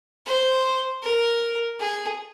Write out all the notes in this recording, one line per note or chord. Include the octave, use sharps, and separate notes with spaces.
C5
A#4
G#4